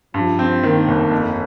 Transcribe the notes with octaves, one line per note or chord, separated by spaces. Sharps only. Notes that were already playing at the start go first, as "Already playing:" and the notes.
G2 F3
C4
D#3 A#3
G1
F2